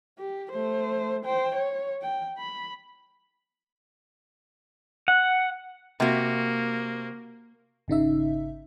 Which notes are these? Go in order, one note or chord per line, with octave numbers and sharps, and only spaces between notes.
G4
A3 C5
C5 G5
C#5
G5
B5
F#5
C3 A#3 F#4
G#1 C#3 D#4 E5